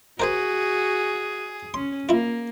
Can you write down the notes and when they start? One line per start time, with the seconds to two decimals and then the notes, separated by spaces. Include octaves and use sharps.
0.20 F#4 G#4 A#4 C5 G#5
1.74 C#4 C6
2.09 A#3 E4 F4